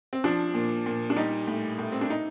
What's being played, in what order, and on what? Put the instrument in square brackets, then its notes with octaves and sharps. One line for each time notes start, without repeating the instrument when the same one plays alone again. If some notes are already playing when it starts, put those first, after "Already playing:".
[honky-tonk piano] C4
F3 D4
A#2
A#2
D4
G3 D#4
A2
A2
C4
D4
D#4